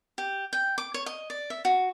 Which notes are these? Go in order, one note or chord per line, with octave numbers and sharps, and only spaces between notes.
G4
G5
D6
C#5
D#5
D5
E5
F#4